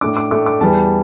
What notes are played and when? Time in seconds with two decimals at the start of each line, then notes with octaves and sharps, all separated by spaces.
0.01 A2 A3 D4 D6
0.17 D6
0.31 A2 A3 D4 D6
0.46 D6
0.61 E2 E3 G3 A5